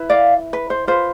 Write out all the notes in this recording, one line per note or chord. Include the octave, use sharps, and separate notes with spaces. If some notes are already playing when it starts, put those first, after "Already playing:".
Already playing: E4 B4
D5 F5
B4
C5
F4 B4 C5